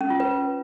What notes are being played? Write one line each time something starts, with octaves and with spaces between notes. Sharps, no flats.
C#4
F4
B4